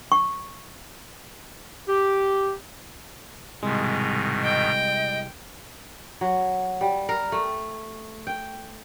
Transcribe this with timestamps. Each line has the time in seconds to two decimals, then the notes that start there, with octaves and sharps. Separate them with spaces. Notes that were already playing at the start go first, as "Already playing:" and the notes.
0.12 C#6
1.88 G4
3.63 C2 G#2 B2 D#3 G#3
4.43 D#5 G5
6.21 F#3
6.81 G3
7.09 A#4
7.32 A3
8.27 G5